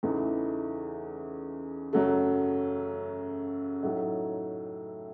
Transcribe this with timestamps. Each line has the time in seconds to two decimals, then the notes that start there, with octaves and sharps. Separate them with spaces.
0.03 E2 C#3 E3 A3 D#4
1.93 F#2 C#3 F#3 A3
3.83 A2 F#3 A3 D#4